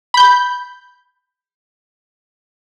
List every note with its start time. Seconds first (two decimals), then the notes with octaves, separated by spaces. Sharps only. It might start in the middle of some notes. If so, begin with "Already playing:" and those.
0.14 B5 G6